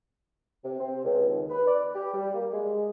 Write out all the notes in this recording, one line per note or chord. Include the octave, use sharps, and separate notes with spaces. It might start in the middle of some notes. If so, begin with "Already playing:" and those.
C3
C4
C#2
D#2
B4
D5
G4
G3
A#3
G#3